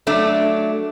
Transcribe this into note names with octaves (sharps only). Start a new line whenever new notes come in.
F#3 A3 D4